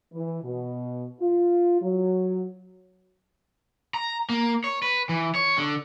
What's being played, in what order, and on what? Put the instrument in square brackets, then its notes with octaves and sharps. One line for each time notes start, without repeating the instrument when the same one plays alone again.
[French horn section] E3
B2
F4
F#3
[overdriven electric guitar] A#5
A#3
C#5
B4
E3
C#5
D3